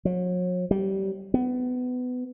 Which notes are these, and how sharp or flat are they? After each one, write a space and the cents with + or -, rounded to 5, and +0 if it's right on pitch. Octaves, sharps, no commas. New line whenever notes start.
F#3 -40
G3 -20
B3 +20